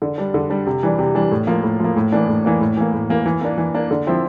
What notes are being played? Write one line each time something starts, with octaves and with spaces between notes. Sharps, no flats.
D3
G3 D4
D3
G3 D4
C3
E3 G3 D4
C3
E3 G3 D4
A2
F3 A#3
A2
F3 A#3
A2
E3 A#3 D4
A2
E3 A#3 D4
A2
E3 A#3
A2
E3 A#3
E3
A#3 D4
E3
A#3 D4
D3
F3 C4 E4